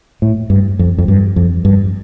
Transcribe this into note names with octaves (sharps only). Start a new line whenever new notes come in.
A2
G2
F2
F2
G2
F2
G2